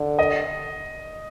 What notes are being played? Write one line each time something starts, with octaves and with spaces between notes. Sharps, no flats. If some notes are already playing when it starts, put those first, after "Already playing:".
Already playing: D3
D#5